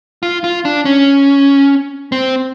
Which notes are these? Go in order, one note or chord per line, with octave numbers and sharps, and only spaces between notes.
F4
F4
D4
C#4
C4